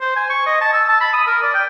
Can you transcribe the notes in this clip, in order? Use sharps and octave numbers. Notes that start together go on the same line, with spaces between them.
C5
G#5
C#6
D#5
A5
E6
A5
B5
D#6
A#4
D5
G5